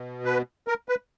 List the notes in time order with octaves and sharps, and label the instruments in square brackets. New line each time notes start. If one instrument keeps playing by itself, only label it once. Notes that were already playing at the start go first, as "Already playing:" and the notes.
Already playing: [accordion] B2
B4
A#4
B4